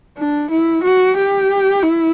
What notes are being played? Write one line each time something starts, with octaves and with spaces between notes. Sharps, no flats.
D4
E4
F#4
G4
E4